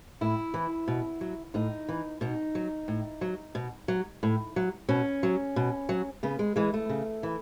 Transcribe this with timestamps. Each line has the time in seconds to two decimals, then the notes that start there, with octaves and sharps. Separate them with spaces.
0.21 A2 E4
0.54 E3
0.88 B2
1.21 F#3
1.54 A2 D#4
1.88 E3
2.21 B2 D#4
2.55 F#3
2.88 A2
3.21 F#3
3.55 B2
3.88 F#3
4.23 A2
4.56 F#3
4.88 B2 C#4
5.23 F#3
5.56 B2
5.89 F#3
6.23 C#3 B3
6.39 G#3
6.56 E3 G#3
6.74 A3
6.89 C#3
7.23 E3